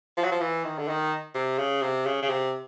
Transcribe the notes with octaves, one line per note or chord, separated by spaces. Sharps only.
F3
F#3
F3
E3
D#3
D3
D#3
C3
C#3
C3
C#3
C#3
C3